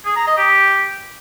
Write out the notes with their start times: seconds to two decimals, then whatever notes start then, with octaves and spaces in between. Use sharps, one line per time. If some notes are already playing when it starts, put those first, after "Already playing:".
0.05 G#4
0.16 A#5
0.27 D#5
0.38 G4